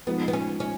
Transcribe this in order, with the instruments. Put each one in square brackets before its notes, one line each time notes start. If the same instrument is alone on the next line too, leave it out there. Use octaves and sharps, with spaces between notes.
[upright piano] F3 G#3 D#4 [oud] B3
[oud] B3
C#4
C#4